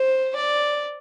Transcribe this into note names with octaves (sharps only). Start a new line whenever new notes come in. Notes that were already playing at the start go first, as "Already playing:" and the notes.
Already playing: C5
D5